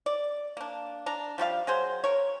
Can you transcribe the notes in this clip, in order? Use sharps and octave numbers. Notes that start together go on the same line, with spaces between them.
D5
A#3 D4
D4 A#5
F3 G3 F#4 F5
F#3 G#4 C5
A#4 C#5